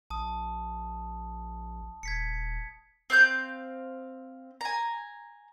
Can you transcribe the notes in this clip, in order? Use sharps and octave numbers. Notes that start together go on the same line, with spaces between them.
A#1 A5 D#6
D#1 G#6 B6 C#7
C4 F5 F#6 G6
G#5 A#5